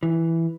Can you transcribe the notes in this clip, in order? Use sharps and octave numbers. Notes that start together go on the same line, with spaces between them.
E3